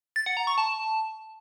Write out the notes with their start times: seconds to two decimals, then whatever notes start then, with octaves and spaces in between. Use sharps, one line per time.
0.16 A6
0.26 F#5
0.37 A#5
0.47 C#6
0.58 A5